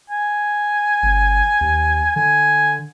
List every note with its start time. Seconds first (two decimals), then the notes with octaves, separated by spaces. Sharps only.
0.10 G#5
1.02 G1
1.61 D#2
2.16 D3 G#5